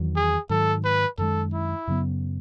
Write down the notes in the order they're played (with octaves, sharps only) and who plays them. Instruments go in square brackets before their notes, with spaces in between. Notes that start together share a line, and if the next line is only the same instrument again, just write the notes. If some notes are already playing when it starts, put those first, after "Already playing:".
Already playing: [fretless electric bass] E2 D#3 F#3
[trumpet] G#4
[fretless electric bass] G#2 D#3 F#3 [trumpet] A4
[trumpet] B4
[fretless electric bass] F#2 D#3 G#3 [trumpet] A4
[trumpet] E4
[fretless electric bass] F#2 C#3 F#3 B3